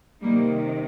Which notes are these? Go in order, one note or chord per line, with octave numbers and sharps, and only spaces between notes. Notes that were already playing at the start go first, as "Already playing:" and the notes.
C3 D#3 G3 A#3